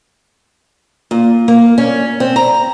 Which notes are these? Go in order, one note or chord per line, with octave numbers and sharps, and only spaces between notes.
A#2
A#3
C#4
C4
A#5